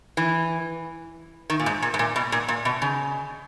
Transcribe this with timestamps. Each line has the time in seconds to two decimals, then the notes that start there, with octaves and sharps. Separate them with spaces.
0.17 E3
1.50 D#3
1.60 A#2
1.66 G#2
1.82 A#2
1.94 G#2
1.99 A#2
2.16 B2
2.32 A#2
2.48 A#2
2.65 B2
2.82 C#3